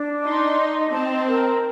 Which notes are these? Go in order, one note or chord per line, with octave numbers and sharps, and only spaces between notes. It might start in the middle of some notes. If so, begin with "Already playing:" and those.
Already playing: D4
D#4 C6
D#5
C4 A5
A#4